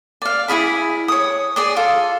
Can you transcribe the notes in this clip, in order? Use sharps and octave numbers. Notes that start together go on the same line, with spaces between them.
D5 F5
E4 F#4 G#4 B5
C#5 D#6
G#4 D5 D#6
F4 A4